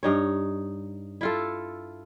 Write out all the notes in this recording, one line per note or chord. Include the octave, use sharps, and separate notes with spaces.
G2 D#4 C#5
E4 F4 A4